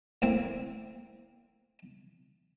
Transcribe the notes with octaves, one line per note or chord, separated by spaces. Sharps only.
A2 A#3 C4